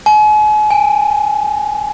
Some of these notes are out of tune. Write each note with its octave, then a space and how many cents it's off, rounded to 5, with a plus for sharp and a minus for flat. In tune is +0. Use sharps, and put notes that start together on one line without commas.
G#5 +40
G#5 -30